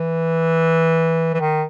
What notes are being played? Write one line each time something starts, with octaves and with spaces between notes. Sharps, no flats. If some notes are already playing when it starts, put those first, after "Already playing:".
Already playing: E3
E3
D#3